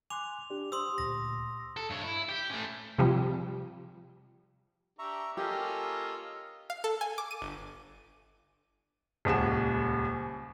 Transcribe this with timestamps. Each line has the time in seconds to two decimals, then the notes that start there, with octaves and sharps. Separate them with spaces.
0.10 G#5 C6 D6 F#6 F7
0.50 D4 G4 D5
0.72 G4 C5 C6 D#6 E6
0.98 D2 A#2 A#6
1.77 A4
1.90 G2 C#5
2.04 E4
2.29 G4
2.50 A3 C#4
2.98 C3 F3 G3
4.99 D4 G4 E5 A#5 C#6
5.37 A#3 C#4 F4 G4 A4 D#5 E6
6.70 F5
6.84 A4
7.01 G#5
7.18 D6
7.31 D#7
7.42 G1
9.25 D#1 C#2 F#5 E7